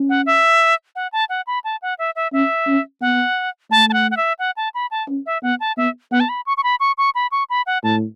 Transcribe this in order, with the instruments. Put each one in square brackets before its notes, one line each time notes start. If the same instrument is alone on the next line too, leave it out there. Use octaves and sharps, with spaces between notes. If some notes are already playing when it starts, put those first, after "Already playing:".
Already playing: [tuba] C#4
[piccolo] F#5
E5
F#5
A5
F#5
B5
A5
F#5
E5
E5
[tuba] C#4 [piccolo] E5
[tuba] C#4
[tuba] B3 [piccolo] F#5
[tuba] A3 [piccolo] A5
[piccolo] A5
F#5
F#5
E5
F#5
A5
B5
A5
[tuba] C#4
[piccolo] E5
[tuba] B3 [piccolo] F#5
[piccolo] A5
[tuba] B3 [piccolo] E5
[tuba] B3 [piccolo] F#5
[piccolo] A5
B5
C#6
C#6
B5
C#6
C#6
B5
C#6
B5
F#5
[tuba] A2 [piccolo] A5